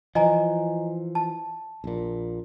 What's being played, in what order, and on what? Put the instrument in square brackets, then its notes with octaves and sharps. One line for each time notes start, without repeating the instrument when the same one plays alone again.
[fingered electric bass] E3 F3 [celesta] D#5 G#5 A#5
[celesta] A5
[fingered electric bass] A#1 A#2